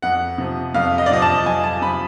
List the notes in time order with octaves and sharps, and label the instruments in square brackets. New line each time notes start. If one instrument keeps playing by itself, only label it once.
[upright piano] F2 F#5
C3 F3
F2 F5
D#5
D5
C3 F3 D#5
A5
F2 G#5
A5
C3 F3 B5